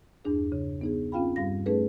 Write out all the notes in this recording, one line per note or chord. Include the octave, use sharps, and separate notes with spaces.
E2 G2 D4 G#4
C#3
B3 D#4 G#4
C4 C#4 F4 F5 G5 B5
G2 G3 F5 A#6
A3 C#4 D#4 G#4 A4 B4